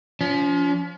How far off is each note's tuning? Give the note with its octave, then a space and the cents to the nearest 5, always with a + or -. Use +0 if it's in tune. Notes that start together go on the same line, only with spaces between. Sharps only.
F3 +0 C#4 +40